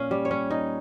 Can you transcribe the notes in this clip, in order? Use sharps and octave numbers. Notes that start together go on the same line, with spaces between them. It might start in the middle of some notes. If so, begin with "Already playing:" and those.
Already playing: A#2 C#4 F5
G3
C#5
C#4
D#4